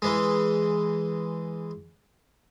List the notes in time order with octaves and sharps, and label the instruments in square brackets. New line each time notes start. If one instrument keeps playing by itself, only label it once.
[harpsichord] E3 G#3